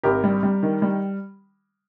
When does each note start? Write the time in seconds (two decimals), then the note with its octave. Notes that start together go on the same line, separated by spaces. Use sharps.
0.03 G#1 G4 A#4
0.24 G3
0.43 G3
0.63 D#3
0.82 G3